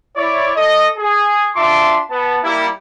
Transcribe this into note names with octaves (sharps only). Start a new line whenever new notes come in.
E4 C#5 D5
A4 D#5
G#4
D4 F4 E5 A5 C6 D6
B3 A5
G3 A#3 E4